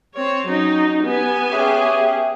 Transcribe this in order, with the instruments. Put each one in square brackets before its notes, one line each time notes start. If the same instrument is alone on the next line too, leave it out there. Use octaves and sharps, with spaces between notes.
[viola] C4 C#5
[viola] F#3 D#4 [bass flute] C#4
[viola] B3 G#5 [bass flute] G4
[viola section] C#4 G4 G#4 [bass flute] E5